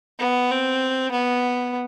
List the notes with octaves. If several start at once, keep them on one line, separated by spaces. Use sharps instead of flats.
B3
C4
B3